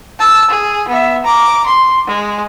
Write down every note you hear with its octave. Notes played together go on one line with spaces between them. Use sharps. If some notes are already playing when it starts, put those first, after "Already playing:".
A5 E6
G#4
B3 E5
A#5 D6
C6
G#3